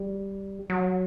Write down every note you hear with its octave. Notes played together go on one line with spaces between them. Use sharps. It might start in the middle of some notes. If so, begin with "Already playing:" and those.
Already playing: G3
F#3